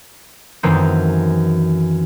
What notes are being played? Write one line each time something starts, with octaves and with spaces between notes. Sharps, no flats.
F#2 D#3 E3 A3 C4